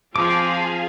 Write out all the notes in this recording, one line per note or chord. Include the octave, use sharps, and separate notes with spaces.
F3 C4 F4 G#4 F5 A5 D6